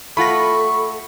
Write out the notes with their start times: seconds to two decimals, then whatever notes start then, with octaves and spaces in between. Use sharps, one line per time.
0.17 A3 F4 A4 F#5 B5 C#6 A#6